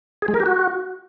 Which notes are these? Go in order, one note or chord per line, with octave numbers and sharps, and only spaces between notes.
G#4
G#3
A#4
G4
F#4